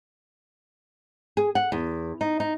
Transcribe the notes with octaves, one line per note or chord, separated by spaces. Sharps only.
G#4
F#5
E2
D#4
D#4